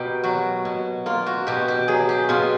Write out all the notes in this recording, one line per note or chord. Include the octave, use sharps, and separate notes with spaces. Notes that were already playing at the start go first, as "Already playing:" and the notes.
Already playing: B2 A#3 G4
F#3 F#4
B2
A#3 F4
F#4
B2 G4
G4
F#3 G#4
G4
B2 F4